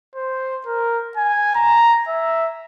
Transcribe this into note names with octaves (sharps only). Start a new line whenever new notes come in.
C5
A#4
G#5
A#5
E5